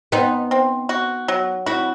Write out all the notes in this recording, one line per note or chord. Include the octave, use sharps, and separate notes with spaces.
B3 C4 D#4
C4
F#4
F#3
C4 E4 F#4